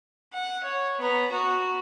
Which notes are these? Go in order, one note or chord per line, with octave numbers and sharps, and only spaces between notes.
F#5
C#5
B3 A#5
F#4